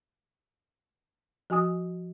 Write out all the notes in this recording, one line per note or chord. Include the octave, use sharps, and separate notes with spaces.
F3 F#4 G#5 D#6